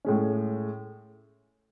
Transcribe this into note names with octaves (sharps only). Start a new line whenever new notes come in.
A2 G#3 C#4